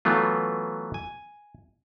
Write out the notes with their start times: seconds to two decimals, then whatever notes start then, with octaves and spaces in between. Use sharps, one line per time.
0.05 E3 F#3 A3 B3 F4
0.94 G#5